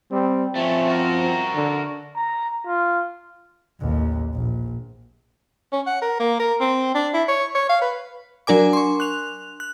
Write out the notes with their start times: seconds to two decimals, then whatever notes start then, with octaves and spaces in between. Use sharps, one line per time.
0.11 G3 C4
0.56 F3 A3 C4 C#4
0.88 F#4 A#4
1.55 D3
2.16 A#5
2.67 F4
3.80 A1 D#2
4.34 A#1
5.72 C#4
5.87 F#5
6.02 A#4
6.19 A#3
6.39 A#4
6.60 C4
6.95 D4
7.14 E4
7.28 C#5
7.54 C#5
7.69 F5
7.81 B4
8.47 F#3 D4 A#4 G#5 D6
8.73 C6 C#6
9.00 F#6 F7
9.60 F#6